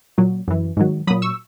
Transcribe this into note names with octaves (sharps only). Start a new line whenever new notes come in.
A#2 F#3
F#2 E3
G#2 D#3 F#3
A#2 F#3 B5 D#6
C#6 E6